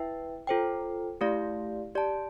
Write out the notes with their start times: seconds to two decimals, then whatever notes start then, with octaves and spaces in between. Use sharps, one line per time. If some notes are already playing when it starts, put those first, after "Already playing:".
Already playing: E4 B4 E5 G5
0.47 F4 A4 C5 G5
1.21 A3 E4 G4 D5 F5
1.95 G4 D5 A5